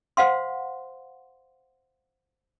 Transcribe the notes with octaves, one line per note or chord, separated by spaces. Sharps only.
C5 F5 F#5 C6